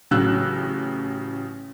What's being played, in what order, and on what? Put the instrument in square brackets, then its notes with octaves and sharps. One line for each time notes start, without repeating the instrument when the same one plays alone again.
[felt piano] A1 C#3 F#3 E6 F#6